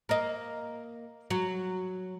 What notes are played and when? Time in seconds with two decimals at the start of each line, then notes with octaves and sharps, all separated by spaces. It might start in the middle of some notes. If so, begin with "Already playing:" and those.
0.09 A#3 D#5
1.30 F#3